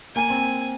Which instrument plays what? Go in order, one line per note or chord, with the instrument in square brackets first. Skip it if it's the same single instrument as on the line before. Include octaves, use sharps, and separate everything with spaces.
[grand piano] A#3 [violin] G#5
[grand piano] C4